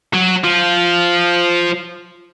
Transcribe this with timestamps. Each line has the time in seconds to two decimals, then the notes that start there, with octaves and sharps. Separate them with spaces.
0.14 F#3
0.44 F3